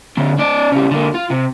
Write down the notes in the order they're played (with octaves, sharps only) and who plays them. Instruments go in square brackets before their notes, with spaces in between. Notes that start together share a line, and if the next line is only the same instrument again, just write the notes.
[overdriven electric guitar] D3 C4
C#4 D5
C#3 G3
D3 A#3
F4
C3